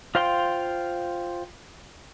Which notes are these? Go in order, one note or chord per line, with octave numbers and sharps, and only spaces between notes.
F4 C5 F5 G5 C6